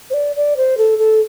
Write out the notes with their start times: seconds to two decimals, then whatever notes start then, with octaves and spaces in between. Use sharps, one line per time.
0.10 C5
0.14 D5
0.36 D5
0.57 C5
0.78 A4
0.98 A4